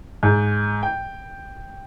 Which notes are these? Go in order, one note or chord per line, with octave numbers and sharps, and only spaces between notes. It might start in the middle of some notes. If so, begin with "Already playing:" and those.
G#2
G5